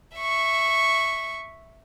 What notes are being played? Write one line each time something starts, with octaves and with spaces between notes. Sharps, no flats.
E5 C#6